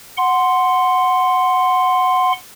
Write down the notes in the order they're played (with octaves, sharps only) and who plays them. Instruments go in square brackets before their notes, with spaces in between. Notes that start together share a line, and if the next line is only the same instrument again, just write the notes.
[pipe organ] F#5 C6